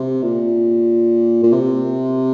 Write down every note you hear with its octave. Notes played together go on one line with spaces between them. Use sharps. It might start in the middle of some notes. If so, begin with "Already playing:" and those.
Already playing: C3
A#2
A#2
C3